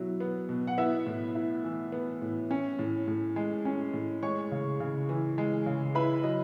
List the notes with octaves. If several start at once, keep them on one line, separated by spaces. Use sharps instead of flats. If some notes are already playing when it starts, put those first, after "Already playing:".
Already playing: B2 F#3 E4
B3
B2
F#5
B3 E4 E5
A2
E4
E3
B3
A2
C#4
A2
A2
G#3
C#4
A2
G#3 C#5 C#6
C#3
C#3
E3
G#3
C#3
E4 B4 B5
F#3 D#5